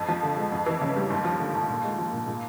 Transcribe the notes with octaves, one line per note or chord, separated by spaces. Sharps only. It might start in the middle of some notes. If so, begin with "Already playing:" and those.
Already playing: F2
F3
D3
G#3
F2
E3
C#3
G3
D#2
F3
D3
D#2
A#2
G#3
F3
A#2
A#2